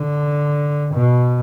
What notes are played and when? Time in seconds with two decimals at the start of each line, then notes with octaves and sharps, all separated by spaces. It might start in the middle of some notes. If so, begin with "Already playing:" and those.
Already playing: D3
0.94 B2